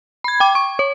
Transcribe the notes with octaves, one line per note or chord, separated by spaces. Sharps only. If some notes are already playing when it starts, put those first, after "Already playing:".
B5 G#6
G5 D6
C#6
C#5